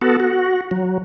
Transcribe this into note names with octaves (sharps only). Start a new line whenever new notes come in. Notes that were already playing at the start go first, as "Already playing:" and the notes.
B3 F#4 A4
F#4
F#3